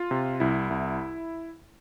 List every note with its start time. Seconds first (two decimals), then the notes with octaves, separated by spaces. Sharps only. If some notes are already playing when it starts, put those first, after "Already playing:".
Already playing: F4
0.11 C3
0.40 C2 E4
0.70 C2